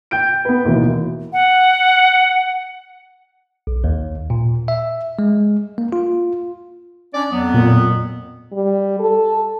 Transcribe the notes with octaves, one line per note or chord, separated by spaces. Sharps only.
G5 G6 D7
B3 B4
D#2 B2 E3
F#5
B1
D#2
A#2
E5
G#3
A#3
F4
C#4 D4 D5
F2 F#3 B3
A#2
G3
A4